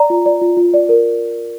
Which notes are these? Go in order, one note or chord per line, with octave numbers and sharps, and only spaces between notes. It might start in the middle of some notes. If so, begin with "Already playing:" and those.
Already playing: D5 A#5
F4
D5
F4
F4
D5
A#4